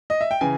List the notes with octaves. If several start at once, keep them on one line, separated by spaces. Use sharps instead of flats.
D#5
E5
G5
C#3 E3 G#5